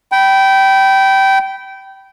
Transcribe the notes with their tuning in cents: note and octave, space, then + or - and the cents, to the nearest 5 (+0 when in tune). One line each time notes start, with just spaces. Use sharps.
G5 -20 B5 +0